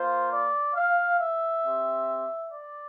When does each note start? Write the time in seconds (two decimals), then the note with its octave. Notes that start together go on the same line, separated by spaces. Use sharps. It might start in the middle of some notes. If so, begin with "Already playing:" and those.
Already playing: A#3 F4 C5
0.31 D5
0.74 F5
1.19 E5
1.62 C4 G4
2.50 D5